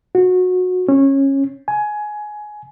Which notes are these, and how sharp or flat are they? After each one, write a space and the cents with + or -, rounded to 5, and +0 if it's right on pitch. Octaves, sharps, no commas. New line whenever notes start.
F#4 -20
C#4 -20
G#5 +15